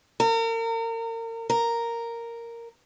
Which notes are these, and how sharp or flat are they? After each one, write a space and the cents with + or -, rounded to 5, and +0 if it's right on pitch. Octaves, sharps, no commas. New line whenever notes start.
A#4 -35
A#4 -5